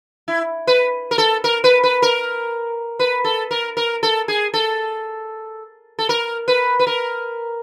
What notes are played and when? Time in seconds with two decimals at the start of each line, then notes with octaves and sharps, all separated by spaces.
0.28 E4
0.67 B4
1.11 A#4
1.18 A4
1.44 A#4
1.64 B4
1.83 B4
2.02 A#4
2.99 B4
3.24 A4
3.51 A#4
3.77 A#4
4.03 A4
4.28 G#4
4.54 A4
5.99 A4
6.09 A#4
6.48 B4
6.79 B4
6.87 A#4